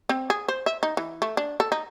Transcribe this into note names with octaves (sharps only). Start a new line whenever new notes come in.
C4
G#4
C5
E5
D#4
E3
A3
D4
A4
D#4